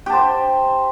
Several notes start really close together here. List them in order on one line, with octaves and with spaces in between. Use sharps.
G4 A5 C5